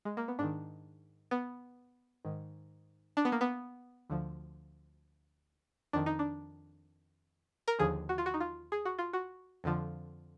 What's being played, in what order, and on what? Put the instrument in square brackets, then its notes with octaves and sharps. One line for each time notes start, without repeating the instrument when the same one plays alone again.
[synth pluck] G#3
A#3
B3
G#2 D#3 D4
B3
G#2 D#3
D4
B3
A#3
B3
D2 D3 F3
F2 D#3 D4
D#4
D4
A#4
D#2 D3 F3 G#4
F#4
F4
F#4
D#4
F4
G#4
F#4
F4
F#4
F2 D3 F3